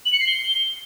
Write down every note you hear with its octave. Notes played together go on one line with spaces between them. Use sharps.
F#7
C#7
C7
G7